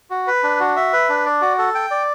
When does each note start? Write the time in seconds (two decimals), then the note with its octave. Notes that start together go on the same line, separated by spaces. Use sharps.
0.10 F#4
0.27 B4
0.43 D4
0.60 F#4
0.76 E5
0.93 B4
1.09 D4
1.25 D5
1.41 F#4
1.58 A4
1.75 G5
1.91 D5